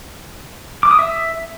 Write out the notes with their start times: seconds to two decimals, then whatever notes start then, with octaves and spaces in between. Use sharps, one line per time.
0.83 D6
0.91 D#6
0.99 E5